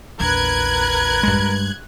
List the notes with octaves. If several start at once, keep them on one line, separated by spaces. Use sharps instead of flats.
A#1 E2 A#4 B4 F#6 G#6
G2 G#3